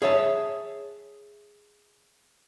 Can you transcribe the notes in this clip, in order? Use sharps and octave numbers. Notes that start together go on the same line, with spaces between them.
G#4 C#5 E5 A5